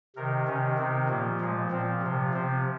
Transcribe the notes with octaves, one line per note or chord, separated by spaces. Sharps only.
C3 D#3 A#4
C3 D#3 C#4
C3 D#3 C4
A#2 F3 A#3
A#2 F3 G#3
A#2 F3 C4
C3 F3
C3 F3 C4